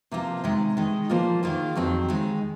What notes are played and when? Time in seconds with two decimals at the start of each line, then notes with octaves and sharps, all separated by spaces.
0.11 C3 F3 A#3 F4 C5
0.44 C3 D#3 G#3
0.77 D#3 G#3 D#4
1.09 A#2 F3 A#3 F4 C5
1.43 D#3 A#3 F4 G#4
1.75 F2 D#3 F#3 C4
2.08 D#2 D#3 G#3 D#4